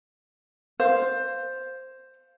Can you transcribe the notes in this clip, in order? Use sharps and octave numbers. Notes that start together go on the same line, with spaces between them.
C5 F5